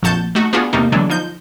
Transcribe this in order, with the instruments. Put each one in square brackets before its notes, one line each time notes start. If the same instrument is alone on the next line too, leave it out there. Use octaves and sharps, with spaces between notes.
[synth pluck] A#1 F2 F#4 A5 G6
A3 D#4 F#4
B3 D4 F4 F#4 G#4
E2 C3 A3 A#3 D#4
B2 D3 E3 F#3 G#3 D4
F3 D#4 G6